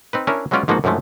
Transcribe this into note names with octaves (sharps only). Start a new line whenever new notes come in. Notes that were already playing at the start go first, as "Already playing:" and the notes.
C4 D#4 B4
C#4 D4 E4 A#4
F#3 G#3 B3 C#4 F4 D5
G#2 F3 A#3 B3 D#4 F#4
F#2 D3 D#3 F3 G#3 A3